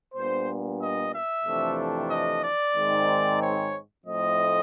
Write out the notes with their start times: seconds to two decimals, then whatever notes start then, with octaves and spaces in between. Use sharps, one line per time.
0.14 A#2 G3 B3 D4 C5
0.79 D#5
1.12 E5
1.45 F2 C3 E3 A3 D4
2.10 D#5
2.42 D5
2.75 G#2 D#3 G#3 C4
3.41 C#5
4.05 A2 F3 A3 C4 D#5